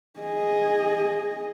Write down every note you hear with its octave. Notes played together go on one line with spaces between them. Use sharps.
G#4 D#5